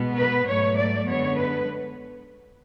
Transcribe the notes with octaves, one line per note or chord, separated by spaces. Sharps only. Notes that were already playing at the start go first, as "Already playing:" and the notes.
Already playing: B2 G#3 B3
B4
G#2 F#3 A3 C#5
D5
F#2 D3 G#3 B3 C#5
B4